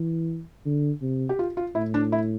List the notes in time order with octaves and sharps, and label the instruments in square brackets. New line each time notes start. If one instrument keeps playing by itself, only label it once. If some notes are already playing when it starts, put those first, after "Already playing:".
Already playing: [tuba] E3
D3
C3
[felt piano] G4
F4
F4
[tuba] A2 [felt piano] E4
[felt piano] D4
E4